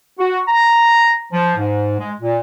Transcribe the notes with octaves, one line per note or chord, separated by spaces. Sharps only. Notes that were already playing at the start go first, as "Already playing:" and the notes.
F#4
A#5
F3
G#2
G#3
A#2